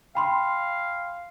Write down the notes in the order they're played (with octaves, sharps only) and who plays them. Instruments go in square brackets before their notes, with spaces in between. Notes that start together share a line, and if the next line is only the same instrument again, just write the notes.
[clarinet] F5 [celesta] G5 B5 C6